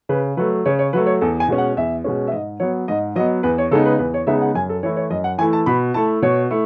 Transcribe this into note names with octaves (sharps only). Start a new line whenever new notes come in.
C#3 B4
F#3 A3 B4
C#3 C#5
C#5
F#3 A3 B4
C#5
E2 A4
G#5
B2 G#3 C#4
F#5
E2 E5
B2 G#3 C#4
E5
G#2 D#5
F#3 B3 C#5
G#2 D#5
F#3 B3 D#5
E2 B4
C#5
C#3 G#3 B3 D#4 A4
B4
E2 B4
C#5
C#3 G#3 B3 D#4 E5
F#5
F#2 G#5
A4
E3 A3 E4 C#5
C#5
F#2 D#5
F#5
E3 A3 E4 G#5
A5
B2 B5
A3 E4 A5
B2 C#5
A3 E4